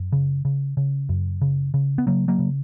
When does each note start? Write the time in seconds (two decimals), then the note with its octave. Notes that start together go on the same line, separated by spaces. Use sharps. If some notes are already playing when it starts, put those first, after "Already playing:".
Already playing: F#2
0.12 C#3
0.45 C#3
0.77 C#3
1.09 F#2
1.42 C#3
1.74 C#3
1.98 B3
2.07 C#3 F#3 A#3
2.28 F#3 A#3
2.39 C#3